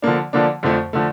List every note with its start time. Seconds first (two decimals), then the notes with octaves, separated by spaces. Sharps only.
0.02 D3 F3 A#3 D4
0.33 D3 F3 A#3 D4
0.63 F2 D3 F3 A3
0.93 D3 F3 A3